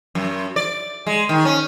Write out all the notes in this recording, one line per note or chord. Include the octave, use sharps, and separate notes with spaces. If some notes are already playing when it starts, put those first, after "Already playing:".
F#2
D5
G#3
D#3
C#4